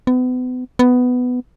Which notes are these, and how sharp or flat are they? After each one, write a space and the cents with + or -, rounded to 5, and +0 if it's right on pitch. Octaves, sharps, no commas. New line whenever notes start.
B3 +35
B3 +10